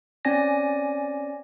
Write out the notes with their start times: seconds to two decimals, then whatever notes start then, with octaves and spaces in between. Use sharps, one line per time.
0.25 C4 C#4 D5 G#5 A#6